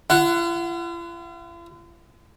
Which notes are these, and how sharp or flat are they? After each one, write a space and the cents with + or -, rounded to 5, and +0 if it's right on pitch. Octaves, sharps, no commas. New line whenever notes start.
F4 -45 F#5 +0